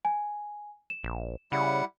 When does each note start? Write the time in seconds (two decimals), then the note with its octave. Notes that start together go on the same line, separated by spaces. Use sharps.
0.05 G#5
0.90 E7
1.04 A#1
1.52 C#3 G3 E4 F#5